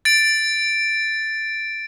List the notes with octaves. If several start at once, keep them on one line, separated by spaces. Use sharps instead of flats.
A6 D7